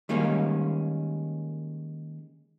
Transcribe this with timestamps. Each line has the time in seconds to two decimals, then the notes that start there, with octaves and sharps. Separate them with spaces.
0.09 D#3 G3 G#3 A#3 C#4